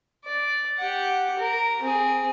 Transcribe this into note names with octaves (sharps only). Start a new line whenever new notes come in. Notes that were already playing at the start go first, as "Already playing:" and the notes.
D5
G4 F#5
A#4
C4 G#4